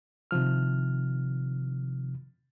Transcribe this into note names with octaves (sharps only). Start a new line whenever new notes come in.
C3 D#3 F3 F6